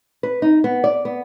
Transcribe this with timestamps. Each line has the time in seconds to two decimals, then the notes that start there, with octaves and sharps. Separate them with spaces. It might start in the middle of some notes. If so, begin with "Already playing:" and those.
0.23 B4
0.42 D#4
0.64 B3
0.84 D5
1.05 B3